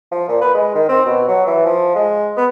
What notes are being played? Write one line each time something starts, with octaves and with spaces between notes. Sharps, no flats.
F3
A#2
B4
G#3
D#3
C4
B2
F#3
E3
F3
G#3
B3